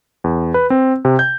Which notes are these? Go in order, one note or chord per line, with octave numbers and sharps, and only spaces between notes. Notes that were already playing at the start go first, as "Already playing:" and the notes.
E2
B4
C4
C3
G6